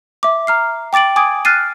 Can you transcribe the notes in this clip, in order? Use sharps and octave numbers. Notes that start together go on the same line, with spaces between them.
E5 D6
A#5 F6 C7
G5 D6 A6 D7 F#7
G#5 D6 D#6 G#6 D7
F6 F#6 A6 C7 D#7